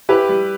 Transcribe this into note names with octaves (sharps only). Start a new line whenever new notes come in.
E4 G4 B4
G3